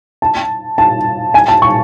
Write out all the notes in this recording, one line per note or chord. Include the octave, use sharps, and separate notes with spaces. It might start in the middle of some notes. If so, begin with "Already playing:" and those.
A5
A5
G#5
A5
C#6